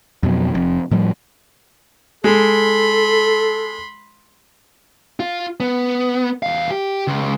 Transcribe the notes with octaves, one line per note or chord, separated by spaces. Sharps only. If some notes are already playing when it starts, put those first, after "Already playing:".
F2 B2 F#3
F1 F2
A2 F3 G3
G#3 A4 B5 C6
F4
B3
E2 F5
G4
C#2